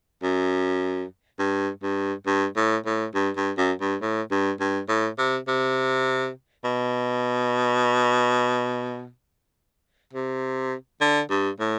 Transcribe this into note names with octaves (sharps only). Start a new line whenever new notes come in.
F#2
G2
G2
G2
A2
A2
G2
G2
F#2
G2
A2
G2
G2
A2
C3
C3
B2
C3
D3
G2
A2